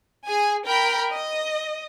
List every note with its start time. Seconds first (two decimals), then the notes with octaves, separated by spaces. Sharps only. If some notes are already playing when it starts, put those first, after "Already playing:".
0.27 G#4 G#5
0.65 A#4 G5 B5
1.13 D#5